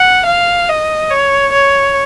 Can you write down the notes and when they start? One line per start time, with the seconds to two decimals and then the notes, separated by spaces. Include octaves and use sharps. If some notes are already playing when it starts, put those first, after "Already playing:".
Already playing: F#5
0.26 F5
0.69 D#5
1.10 C#5
1.53 C#5